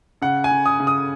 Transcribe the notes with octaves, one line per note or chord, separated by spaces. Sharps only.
C#3 F#5
G#5
C#3
D#6
C#3
D#6